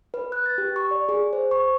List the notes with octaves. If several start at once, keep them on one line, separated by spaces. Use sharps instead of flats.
B4
F#6
A6
G4
C#6
D5
G#4
C5
C#6